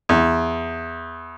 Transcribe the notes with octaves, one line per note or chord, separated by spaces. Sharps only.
E2